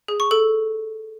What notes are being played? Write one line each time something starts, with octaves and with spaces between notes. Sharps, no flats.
G#4
C#6
A4